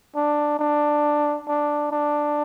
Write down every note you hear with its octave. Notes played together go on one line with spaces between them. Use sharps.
D4
D4
D4
D4